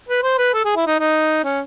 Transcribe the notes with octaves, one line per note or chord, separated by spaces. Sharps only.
B4
C5
B4
A4
G#4
E4
D#4
D#4
C#4